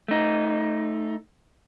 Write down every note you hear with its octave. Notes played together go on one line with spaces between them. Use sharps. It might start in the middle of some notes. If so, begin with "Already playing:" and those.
A3 D#4